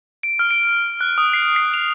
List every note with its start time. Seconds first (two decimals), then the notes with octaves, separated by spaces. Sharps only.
0.23 D7
0.39 F6
0.51 D7
1.01 F#6
1.18 D#6
1.34 C7
1.56 C7
1.74 F7